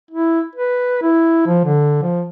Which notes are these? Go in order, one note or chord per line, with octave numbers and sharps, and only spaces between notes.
E4
B4
E4
F3
D3
F3